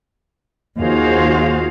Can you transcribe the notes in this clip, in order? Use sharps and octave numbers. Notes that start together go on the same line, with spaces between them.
D#2 F4 F#4 G#4 C5 F5